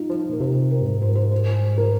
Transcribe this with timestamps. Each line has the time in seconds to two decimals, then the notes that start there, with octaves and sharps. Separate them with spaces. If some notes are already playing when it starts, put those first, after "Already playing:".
Already playing: D#4 F4
0.10 F3
0.29 A#2 A#4
0.40 C3 C5
0.71 A#4
0.82 G2
0.86 G#2
1.02 C5
1.08 A#4
1.15 C5
1.31 C5
1.78 A#4